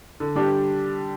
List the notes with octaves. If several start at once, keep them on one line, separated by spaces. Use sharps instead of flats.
D3
G3 D4 G4